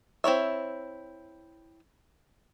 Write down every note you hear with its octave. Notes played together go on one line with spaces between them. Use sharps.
C4 E4 C#5 E5